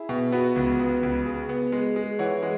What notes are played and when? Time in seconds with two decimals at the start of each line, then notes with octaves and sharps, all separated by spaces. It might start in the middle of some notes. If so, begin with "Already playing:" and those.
Already playing: E4 G#4
0.09 B2
0.32 B3 F#4 B4
0.56 C#2
0.79 B3
1.03 C#2
1.26 G#4
1.49 B3
1.72 G#3
1.96 G#3
2.19 E3 C#5 F#5
2.42 G#3